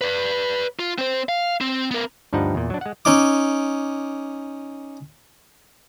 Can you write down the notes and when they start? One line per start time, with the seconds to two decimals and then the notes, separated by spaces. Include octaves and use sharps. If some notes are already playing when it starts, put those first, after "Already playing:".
0.01 B4 D5
0.79 F4
0.98 C4 C5
1.29 F5
1.61 C4
1.91 B3 A#4
2.33 D2 G2 F3 G3 D#4 F#5
2.55 E2 A#2
2.70 F#3 D4
2.81 G#3 F#5
3.05 C#4 D#4 D6